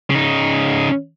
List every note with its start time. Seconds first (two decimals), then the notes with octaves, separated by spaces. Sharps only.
0.10 C#3 D#4